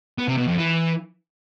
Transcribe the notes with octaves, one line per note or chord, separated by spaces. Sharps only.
B3
C3
B2
F2
E3